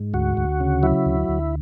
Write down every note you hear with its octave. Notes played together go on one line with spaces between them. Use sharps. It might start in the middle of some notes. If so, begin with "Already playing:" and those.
Already playing: G#2
D2 F#4
D2
C#3
F#3 E4
D2
D2